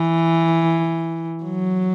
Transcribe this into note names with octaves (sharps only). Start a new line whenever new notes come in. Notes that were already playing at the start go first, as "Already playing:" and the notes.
Already playing: E3
F#3